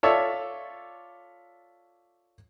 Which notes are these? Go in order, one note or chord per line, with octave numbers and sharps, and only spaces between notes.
F4 A4 C#5 D5 E5